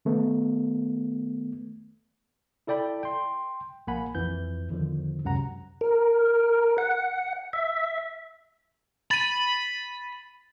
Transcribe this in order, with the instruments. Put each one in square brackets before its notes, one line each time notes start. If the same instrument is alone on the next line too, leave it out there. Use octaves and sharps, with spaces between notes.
[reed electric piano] D#3 A3 B3
[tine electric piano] E4 A4 D5 G5 B5
G5 C6
A#1 A#3 F#5 G#5 B5
F2 E3 G6
E2 D3 D#3 F3
C#2 F#2 C3 F#5 A#5
[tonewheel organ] A#4
F#5
E5
[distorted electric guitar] B5 [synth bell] A6 D#7